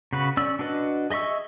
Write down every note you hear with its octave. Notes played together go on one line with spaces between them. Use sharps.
C#3 F#4 B4
C#4 D5 E6
D4 F#4 B4 D#5
G#4 D#5 E5 C#6 E6